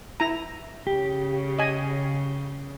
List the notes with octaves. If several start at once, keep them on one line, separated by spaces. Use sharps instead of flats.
E4 A#5
C#3 G4
D#5 G#5